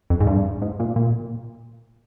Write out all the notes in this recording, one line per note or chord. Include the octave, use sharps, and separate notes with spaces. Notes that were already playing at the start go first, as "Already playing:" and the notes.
F2
G#2
G2
G#2
A#2
A#2